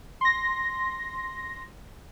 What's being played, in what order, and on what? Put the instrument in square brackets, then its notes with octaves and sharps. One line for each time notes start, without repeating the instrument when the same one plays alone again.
[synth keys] C6 A#6